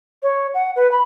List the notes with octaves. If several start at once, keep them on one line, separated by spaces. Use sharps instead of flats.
C#5
F#5
B4
B5